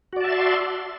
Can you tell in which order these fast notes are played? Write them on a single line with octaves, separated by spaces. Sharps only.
F#4 D5 A5 E5 C6